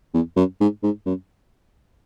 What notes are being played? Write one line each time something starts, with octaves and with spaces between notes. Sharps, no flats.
E2
F#2
G#2
G#2
F#2